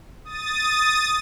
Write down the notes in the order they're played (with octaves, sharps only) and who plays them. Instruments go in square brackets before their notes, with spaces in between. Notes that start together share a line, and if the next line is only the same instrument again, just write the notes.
[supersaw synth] D#6 A6